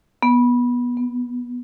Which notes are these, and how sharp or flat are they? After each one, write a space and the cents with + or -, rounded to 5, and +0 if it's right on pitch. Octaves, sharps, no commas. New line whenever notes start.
B3 -20
B3 +20